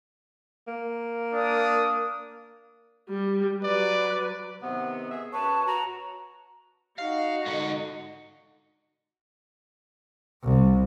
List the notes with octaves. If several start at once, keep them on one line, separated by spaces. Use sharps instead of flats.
A#3
D4 D#6
G3
F#3 B4 D5
C3 D#3 B3
G#4 E5
F#2 B4 C#5 A5
F#4 A#5
D#4 F#4 F5
G#2 D3
C2